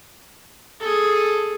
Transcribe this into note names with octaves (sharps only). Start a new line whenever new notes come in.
G#4 A4